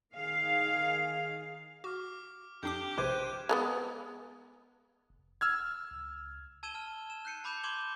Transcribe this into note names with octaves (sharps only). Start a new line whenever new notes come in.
D#3 G#4 F5
F#4 D6 F6
F2 D4 G4 D6 G6
A#1 C3 C5 D6 F#6 G#6 D#7
G#3 A#3 B3
F1
E6 F6 G#6
C#2
A5 E6 G#6 D#7 E7 G7
A5 F6
E7
F#6 G6 C7 C#7 D#7
A5 B5 D6 G6 C7 E7
C6 D6 G#6 E7 G7